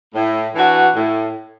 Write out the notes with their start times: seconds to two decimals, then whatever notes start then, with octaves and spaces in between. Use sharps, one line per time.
0.14 A2
0.54 E3 D4 F#4 B4
0.95 A2